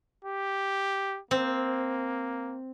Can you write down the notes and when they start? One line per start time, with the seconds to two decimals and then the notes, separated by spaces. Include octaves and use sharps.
0.25 G4
1.31 A#3 C4